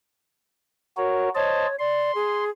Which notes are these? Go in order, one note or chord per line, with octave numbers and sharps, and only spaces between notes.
F#4 A#4 C#5
C5 C#5 D#5 A5
D5 C6
G#4